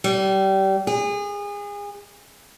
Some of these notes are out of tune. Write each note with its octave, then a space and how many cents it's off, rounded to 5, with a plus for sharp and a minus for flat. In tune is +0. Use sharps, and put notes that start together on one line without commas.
G3 -25
G#4 -30